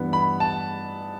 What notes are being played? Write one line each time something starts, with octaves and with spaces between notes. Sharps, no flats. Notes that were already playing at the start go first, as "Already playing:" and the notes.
Already playing: G2 E3 B3
B5
A5